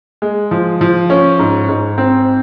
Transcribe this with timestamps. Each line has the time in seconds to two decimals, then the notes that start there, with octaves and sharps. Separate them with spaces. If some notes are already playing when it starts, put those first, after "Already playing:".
0.22 G#3
0.51 F3
0.81 F3
1.10 C#4
1.39 G#2
1.68 G#2
1.98 C4